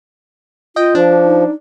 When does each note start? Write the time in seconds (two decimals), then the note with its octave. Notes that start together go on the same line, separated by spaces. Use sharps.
0.76 F4 D#5 G5
0.95 F3 D4
1.25 D#4